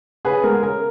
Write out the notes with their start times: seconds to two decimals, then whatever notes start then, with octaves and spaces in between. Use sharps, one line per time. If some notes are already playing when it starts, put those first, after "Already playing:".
0.25 C#3 G#4 B4
0.43 G#3 B3 A#4
0.54 G#4
0.63 C#3 A#4